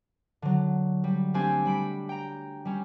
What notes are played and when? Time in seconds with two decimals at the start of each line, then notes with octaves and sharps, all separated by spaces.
0.42 D3 F#3
1.04 G3
1.34 A3 C4 D4 G4 G#5
1.65 G3 B5 D7
2.09 G5 A#5
2.65 G3 C#4